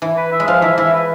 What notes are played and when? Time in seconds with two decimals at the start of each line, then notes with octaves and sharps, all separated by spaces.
0.02 E3
0.17 B4
0.32 E5
0.40 G#3
0.48 F3 F5
0.62 E3 E5
0.78 E3 E5
0.93 B4